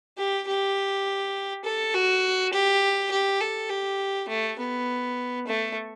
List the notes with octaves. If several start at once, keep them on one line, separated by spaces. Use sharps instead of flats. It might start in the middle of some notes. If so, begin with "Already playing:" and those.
G4
G4
A4
F#4
G4
G4
A4
G4
A3
B3
A3